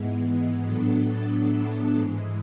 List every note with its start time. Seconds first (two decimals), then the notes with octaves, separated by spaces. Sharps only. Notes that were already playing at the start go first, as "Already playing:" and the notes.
Already playing: G#2 E3 G#3 B3
0.64 A2 F#3 B3 D4 A4
1.94 G#2 E3 G#3